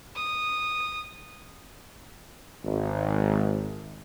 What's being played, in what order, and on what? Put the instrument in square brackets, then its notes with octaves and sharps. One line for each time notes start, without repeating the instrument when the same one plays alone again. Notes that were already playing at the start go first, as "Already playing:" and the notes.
[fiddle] D#6
[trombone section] G#1